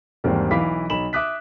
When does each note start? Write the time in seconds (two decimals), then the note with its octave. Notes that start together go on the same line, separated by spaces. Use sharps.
0.24 E2 G#2 D#3 G3 A#3 C4
0.51 B1 E3 F5 B5 D6 B6
0.90 B1 B5 E7 F#7
1.13 E5 D6 D#6 F#6 B6